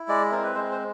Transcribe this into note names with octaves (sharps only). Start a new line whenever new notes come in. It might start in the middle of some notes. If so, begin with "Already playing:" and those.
Already playing: E4
G#3 D5
C4 A#4
B4
G#3 C5
C5